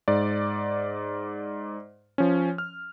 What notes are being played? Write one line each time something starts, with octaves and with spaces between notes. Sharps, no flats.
G#2 D5
F3 C#4
F6